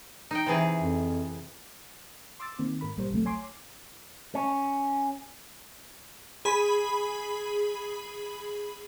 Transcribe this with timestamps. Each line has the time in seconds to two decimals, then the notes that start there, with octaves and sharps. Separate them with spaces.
0.31 D#4 G5
0.46 C3 E3 G#4
0.82 F2
2.40 C6 D6 E6 A6
2.59 D#3 A#3 C4
2.81 G#2 A#4 B5
2.97 A1 A#2 G3 A#4 C5
3.11 A1 D2 C3 F#3 A3
3.25 C#5 G#5 C6 D6
4.35 C#4
6.45 G#4 B5